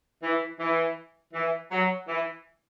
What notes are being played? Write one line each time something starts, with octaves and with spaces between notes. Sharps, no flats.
E3
E3
E3
F#3
E3